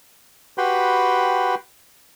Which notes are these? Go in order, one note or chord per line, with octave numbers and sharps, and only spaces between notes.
F#4 G4 B4 G5 B5 C6